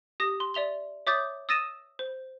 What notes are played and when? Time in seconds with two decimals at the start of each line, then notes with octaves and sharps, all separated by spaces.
0.20 G4 D#6 A#6
0.40 C6
0.54 D5 E5 F7 G7
1.07 C#5 E5 D6 D#6 G6 A6
1.49 D#6 E6 A6 A#6 D#7 E7
1.99 C5